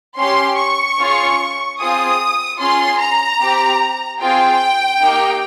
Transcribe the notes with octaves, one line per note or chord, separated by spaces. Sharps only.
C#4 G4 C6
C#6
C#4 F4 G#4
C4 F4 G#4 D#6
C#4 F4 G#4 C6
A#5
C4 G4
C4 F4 G#4 G5
A#3 D#4 G4